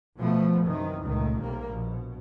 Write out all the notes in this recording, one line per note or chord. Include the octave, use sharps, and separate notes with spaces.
B2 F3 A3 B3
F#2 C3 D#3 E3
C#2 A#2 D#3 A3
B1 C3 G3 A#3
A#1 B2